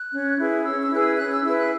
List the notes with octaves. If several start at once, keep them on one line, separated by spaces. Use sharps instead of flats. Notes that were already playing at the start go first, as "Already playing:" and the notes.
Already playing: F#6
C#4
E4 G#4 B4
C#4 E6
E6
E4 G#4 B4 F#6
E6
C#4 F#6
E6
E4 G#4 B4 E6
F#6